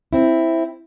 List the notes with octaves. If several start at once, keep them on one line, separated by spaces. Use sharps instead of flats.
C4 E4